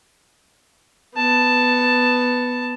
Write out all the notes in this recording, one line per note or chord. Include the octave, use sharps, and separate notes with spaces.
B3 A5